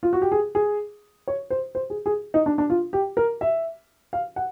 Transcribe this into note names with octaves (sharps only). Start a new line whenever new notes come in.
F4
F#4
G4
G#4
G#4
C#5
C5
C5
G#4
G#4
D#4
D4
D4
F4
G4
A#4
E5
F5
F#5